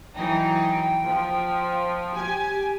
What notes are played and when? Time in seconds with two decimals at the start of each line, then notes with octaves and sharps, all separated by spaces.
0.16 E3 F#3 D#4 G5
1.06 F3
2.17 G4 G#5